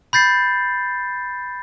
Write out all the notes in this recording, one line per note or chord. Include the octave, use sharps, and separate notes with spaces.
B5 G6 A6 C7